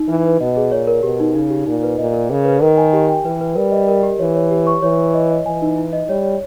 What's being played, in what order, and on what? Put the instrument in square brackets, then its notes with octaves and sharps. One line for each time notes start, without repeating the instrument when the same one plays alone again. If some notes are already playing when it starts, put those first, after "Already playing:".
Already playing: [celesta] D#4
[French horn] E3 [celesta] B4
[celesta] B4
[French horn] B2 [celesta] D#5
[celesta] G#4
[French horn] A#2 [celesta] C#5
[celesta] A#4
[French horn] B2 [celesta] G4
[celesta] D#4
[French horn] C#3 [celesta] D#4
[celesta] G4
[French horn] A#2 [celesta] D#4
[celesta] B4
[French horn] A#2 [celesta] D#5
[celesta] A#4
[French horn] C#3 [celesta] G#4
[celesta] B4
[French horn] D#3 [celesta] A#4
[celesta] G#5
G4
G5
[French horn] E3 [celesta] B4
[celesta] B4
[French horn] G3 [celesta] A#4
[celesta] D#5
A#4
G4
[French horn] E3 [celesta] C#5
[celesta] C#5
G4
C#6
[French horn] E3 [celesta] C#5
[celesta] C#5
D#5
D#5
[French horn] E3 [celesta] G#5
[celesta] D#4
E4
D#5
[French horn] G3 [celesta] C#5
[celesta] C#5